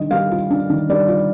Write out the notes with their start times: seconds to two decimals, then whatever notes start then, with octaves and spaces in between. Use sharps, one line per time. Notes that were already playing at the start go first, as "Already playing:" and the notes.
Already playing: D#3 G3 D4 D#5
0.11 G3 F5
0.31 F4
0.50 D4
0.70 D#3
0.89 G3 D5
1.08 F4